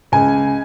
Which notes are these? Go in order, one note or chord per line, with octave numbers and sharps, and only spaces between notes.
C#2 G#5